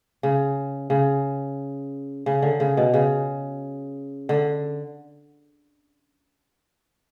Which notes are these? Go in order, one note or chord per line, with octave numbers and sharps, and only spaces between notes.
C#3
C#3
C#3
D3
C#3
B2
C#3
D3